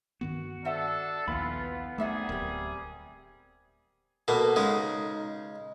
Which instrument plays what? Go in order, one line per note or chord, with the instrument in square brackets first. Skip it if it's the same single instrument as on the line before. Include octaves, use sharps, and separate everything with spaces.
[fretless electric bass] G2 D#3 B3 [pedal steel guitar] F#4
[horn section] D4 A4 [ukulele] C5 E5 F#5
[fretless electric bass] A#1 D#2 [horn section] E3 F3 F4 [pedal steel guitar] B3 B5
[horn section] C3 G3 G#4 [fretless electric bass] A3 [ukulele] D#4 E5 F#5
[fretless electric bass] D1 [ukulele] G4 A#4
[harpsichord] B2 A#3 [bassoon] A4
[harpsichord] C#3 G#3 [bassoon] D#4